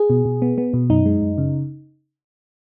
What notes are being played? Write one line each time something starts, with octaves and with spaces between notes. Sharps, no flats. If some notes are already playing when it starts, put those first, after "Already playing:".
Already playing: G#4
B2
B2
B3
B3
B2
F#2 D#4
G#3
F#2
C#3